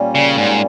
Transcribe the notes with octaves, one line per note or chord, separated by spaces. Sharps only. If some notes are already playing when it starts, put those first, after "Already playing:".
Already playing: A#2 G3 A#3 C#4
C#3
G#2